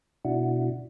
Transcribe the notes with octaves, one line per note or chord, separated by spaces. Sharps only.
B2 D4 E4 F#4